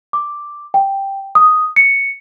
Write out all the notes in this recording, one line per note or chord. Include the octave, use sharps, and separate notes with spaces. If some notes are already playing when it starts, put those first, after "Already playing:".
D6
G5
D#6
C#7